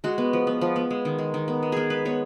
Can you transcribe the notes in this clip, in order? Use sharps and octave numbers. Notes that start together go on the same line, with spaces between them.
G#3 F#4
B3
F3
B3
F3
B3
G#3
D#3
G#3
D#3
B3
G#3
B3 G#4 A#4
G#3 B4
B3 C#5